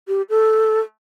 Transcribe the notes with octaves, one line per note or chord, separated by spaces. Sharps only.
G4
A4